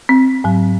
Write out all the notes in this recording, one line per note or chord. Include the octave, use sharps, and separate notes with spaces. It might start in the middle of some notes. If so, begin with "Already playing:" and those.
C4
G#2 F#3